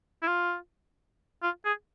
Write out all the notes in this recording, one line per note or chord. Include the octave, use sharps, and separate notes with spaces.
E4
F4
F4
G#4